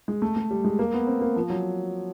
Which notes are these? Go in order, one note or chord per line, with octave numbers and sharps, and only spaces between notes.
G#3
A3
A3
G3
G#3
A#3
B3
C4
A#3
F3
F#3